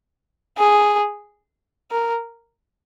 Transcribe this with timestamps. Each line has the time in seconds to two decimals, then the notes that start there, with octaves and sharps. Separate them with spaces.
0.58 G#4
1.91 A#4